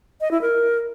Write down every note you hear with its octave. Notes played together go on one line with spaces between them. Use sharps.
D#5
E4
A#4